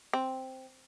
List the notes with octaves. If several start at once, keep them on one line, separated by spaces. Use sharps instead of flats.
C4